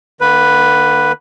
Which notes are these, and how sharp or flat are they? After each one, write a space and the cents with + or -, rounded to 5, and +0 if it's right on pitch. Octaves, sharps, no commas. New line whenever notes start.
D3 +35 A#3 -5 B4 +0